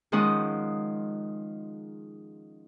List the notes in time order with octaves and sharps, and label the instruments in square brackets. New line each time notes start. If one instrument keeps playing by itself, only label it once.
[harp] D#3 F3 G#3 C#4 F#5 D#6